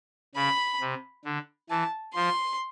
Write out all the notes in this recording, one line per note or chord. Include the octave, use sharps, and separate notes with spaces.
C#3 B5
C3
D3
E3 A5
F3 C6